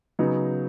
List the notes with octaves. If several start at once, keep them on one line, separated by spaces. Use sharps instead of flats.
C#3 F#3 B3 D#4